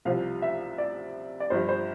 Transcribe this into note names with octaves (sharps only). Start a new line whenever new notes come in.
C2 C3 F3 F5
E5
D5
D5
G1 G2 F3 C5
C5